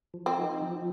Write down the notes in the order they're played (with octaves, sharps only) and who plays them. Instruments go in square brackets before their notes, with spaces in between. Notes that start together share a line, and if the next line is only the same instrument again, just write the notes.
[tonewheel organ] F3
[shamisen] C4
[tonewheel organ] D#4
F3